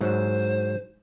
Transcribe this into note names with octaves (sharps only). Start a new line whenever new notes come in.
G#2 F#3 C5